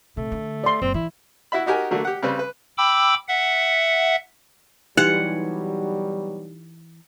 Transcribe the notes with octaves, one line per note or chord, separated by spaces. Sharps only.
C3 A3
D3
D5 C6
F#1 C4
E3 E4
E4 F#4 E5 B5
D#4 F#4 G4 A#4 G#5
D3 F#3 A3 A#3
G4 F#5
C#3 G3 C4 B4
B4
G5 B5 D6 E6
E5 F#5
B2 E3 F#3 G3 D#4 G4 F#5 G#6